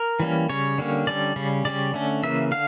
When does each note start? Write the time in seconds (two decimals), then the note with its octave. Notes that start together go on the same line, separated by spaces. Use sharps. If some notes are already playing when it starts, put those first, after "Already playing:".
Already playing: A#4
0.20 E3 G3 A#3 C#4
0.49 C#3 G3 C#4 C#5
0.78 D3 G3 A#3 C#4
1.07 D3 G3 C#4 D5
1.36 C#3 G3 C#4
1.65 C#3 G3 C#4 D5
1.94 D3 A3 C#4
2.23 C#3 E3 A#3 C#4 E5
2.51 D3 F5